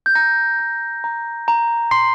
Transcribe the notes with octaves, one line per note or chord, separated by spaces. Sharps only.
G6
A#5 A#6
G6
A#5
A#5
C6 C7